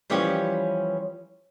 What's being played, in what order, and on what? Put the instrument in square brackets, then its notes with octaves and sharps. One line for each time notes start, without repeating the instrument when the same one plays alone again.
[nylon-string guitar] E3 F3 G3 C#4 G4 C#5